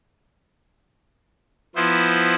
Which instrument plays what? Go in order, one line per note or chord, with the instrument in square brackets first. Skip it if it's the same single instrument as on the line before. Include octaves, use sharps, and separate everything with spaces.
[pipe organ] F3 B3 E4 C5